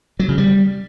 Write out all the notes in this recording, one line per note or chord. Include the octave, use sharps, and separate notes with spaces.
F#3
C#3
G3